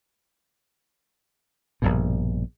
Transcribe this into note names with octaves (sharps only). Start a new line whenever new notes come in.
A#1 G2 B2